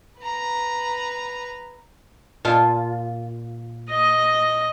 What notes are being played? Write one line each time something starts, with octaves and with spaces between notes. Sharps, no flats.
B4 A#5
A#2 F4 A5
D#5